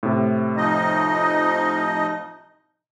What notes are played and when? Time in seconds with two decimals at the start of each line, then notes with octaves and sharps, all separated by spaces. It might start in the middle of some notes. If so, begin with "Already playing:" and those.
0.03 A2 C3
0.57 F3 D#4 D#5